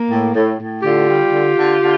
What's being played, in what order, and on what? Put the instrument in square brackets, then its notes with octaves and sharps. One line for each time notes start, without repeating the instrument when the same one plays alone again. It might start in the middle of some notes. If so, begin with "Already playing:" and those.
Already playing: [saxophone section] A#3
A2
A2
A2
D3 F4 G4
G3
D3
D3
D3